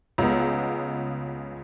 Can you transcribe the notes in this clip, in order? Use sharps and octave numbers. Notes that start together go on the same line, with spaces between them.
C#2 C#3 G#3 B3